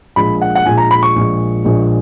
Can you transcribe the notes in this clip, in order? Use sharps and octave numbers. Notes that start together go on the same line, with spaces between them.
A#1 A#2 G#3 B5
F#5
F#5
A#1 A#2 G#3 G#5
A#5
B5
C#6
A#1 A#2 G#3
A#1 A#2 G#3